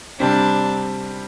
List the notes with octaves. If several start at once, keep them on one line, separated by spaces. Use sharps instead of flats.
C3 G3 C4 D4